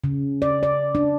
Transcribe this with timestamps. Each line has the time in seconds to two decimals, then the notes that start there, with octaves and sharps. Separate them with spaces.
0.04 C#3
0.42 D5
0.63 D5
0.95 D4